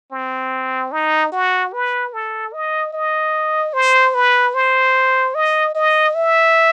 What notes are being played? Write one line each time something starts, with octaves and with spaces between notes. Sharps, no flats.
C4
D#4
F#4
B4
A4
D#5
D#5
C5
B4
C5
D#5
D#5
E5